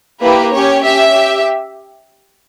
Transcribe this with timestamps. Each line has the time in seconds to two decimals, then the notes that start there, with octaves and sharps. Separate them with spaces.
0.22 A#3 E4 G4 B4
0.53 C#4 G4 C#5
0.84 C#4 G4 E5
1.16 G4